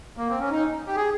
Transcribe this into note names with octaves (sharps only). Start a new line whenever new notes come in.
A#3
C4
C#4
D#4
G4
G#4